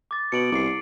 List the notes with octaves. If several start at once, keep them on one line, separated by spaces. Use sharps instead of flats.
D6 A6
B2 C#7 D7 F#7
C2 D6 C7